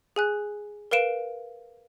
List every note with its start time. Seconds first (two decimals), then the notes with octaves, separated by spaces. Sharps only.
0.16 G#4 G#5 F#6
0.91 A#4 B4 F5 D7 E7